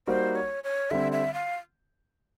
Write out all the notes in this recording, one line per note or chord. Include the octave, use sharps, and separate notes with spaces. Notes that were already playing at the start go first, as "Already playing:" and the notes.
G3 A#3 D#4 F#4 C5
C#5
C#5
D3 G3 C4 E5
E5
F5